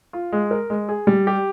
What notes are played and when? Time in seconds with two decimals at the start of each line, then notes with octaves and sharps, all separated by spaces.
0.13 F4
0.32 G#3
0.51 A#4
0.70 G#3
0.89 G#4
1.07 G3
1.27 G4